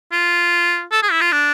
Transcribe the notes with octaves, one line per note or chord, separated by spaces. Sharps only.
F4
A4
G#4
E4
F4
D4